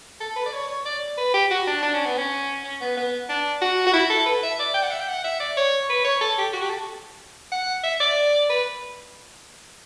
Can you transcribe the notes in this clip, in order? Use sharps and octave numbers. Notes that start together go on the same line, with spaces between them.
A4
B4
D5
C#5
C#5
D5
B4
G4
F#4
D4
D4
C#4
B3
C#4
C#4
B3
B3
D4
F#4
F#4
E4
A4
B4
E5
D5
G5
F#5
E5
G5
F#5
E5
D5
C#5
B4
C#5
A4
G4
F#4
G4
A4
F#5
E5
D5
B4